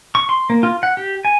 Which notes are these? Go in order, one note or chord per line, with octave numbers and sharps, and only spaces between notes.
C#6
C6
A#3
F4
F#5
G4
G#5